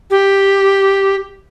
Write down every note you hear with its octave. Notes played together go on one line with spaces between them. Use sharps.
G4